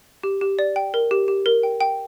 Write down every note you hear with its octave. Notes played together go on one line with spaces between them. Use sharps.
G4
G4
D5
G5
A#4
G4
G4
A#4
G5
G5